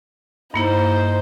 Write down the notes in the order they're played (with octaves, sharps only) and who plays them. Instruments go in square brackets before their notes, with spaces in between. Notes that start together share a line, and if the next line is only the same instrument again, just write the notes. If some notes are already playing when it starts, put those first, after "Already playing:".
[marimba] G2 A#3 E4 [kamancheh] D#4 C5